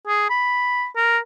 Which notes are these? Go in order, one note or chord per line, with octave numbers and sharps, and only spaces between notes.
G#4
B5
A#4